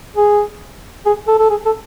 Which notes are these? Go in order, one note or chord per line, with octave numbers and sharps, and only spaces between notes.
G#4
G#4
A4
A4
G#4
A4